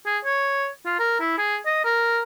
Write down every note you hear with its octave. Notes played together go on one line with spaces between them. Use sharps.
G#4
C#5
F4
A#4
E4
G#4
D#5
A#4